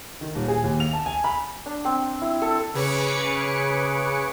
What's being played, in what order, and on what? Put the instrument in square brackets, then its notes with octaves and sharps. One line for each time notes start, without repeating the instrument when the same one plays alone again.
[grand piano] D#3
D#1
G#4
D#2
F7
A5
G#5
B5
[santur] D4
C4
E4
A4
[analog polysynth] C#3 G#4 B4 C#5 D6 C#7